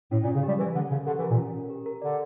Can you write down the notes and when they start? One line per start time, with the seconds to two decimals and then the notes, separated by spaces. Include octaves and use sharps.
0.11 A2 C#4
0.23 A#2
0.28 C#4
0.35 C#3
0.43 G3 G4
0.58 E3 A#4
0.74 D3 C#4
0.91 C#3 C#4
1.07 D3 G4
1.19 E3
1.22 A#4
1.30 A#2
1.38 C#4
1.54 C#4
1.70 G4
1.86 A#4
2.02 D3 D5